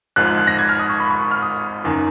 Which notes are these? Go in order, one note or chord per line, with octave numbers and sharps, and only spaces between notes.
G#1 G#2 F3 F#6
F#6
F#6
A#6
G#6
F6
D#6
C#6
B5
C#6
F6
D#6
F#1 F#2 D#3